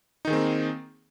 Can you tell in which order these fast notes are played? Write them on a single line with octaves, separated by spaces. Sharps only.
D#4 D#3 G#4 C4 A#3